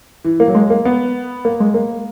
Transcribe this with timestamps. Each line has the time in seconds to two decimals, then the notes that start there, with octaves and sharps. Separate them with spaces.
0.25 E3
0.40 A#3
0.48 F#3
0.55 G#3
0.70 A#3
0.85 B3
1.45 A#3
1.60 G#3
1.74 A#3